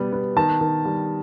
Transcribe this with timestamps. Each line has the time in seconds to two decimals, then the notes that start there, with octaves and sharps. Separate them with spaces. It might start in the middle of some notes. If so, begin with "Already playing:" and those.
Already playing: B2 G3 B3
0.12 B3
0.36 D#3 A5
0.61 D#3
0.85 G3